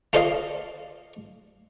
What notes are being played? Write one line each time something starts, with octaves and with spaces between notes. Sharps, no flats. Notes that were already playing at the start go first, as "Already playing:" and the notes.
F4 A4 C5 D5 D#5 F5